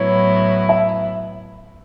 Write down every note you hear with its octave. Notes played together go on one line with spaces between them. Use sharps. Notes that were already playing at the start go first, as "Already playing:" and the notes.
Already playing: A2 F#3 B3 E4 C#5
E5